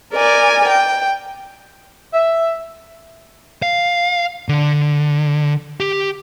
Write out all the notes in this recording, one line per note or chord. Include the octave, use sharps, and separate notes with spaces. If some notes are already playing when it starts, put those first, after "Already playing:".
A#4 D5 G#5
G5
E5
F5
D3
G4